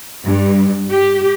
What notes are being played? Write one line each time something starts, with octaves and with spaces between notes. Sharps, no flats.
G2
G4